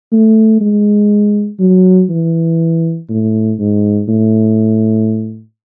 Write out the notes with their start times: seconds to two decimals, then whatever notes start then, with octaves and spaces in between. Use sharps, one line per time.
0.12 A3
0.60 G#3
1.59 F#3
2.09 E3
3.09 A2
3.59 G#2
4.08 A2